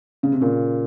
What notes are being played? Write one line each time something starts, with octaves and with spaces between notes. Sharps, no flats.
C#3
C3
A#2 C#3